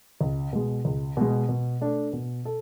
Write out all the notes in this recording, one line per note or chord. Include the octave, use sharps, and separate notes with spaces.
C#2
B2 G#3
C#2
B2 G#3
B2
A3 D4 A4
B2
A4